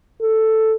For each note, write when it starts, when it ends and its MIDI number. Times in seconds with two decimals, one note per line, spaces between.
0.22 0.75 69